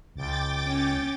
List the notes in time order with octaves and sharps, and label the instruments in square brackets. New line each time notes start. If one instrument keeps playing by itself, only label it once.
[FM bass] C#2 [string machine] G5 D6 A6
[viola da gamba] C#4